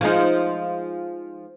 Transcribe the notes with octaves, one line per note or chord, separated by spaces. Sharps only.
F3 G#3 D#4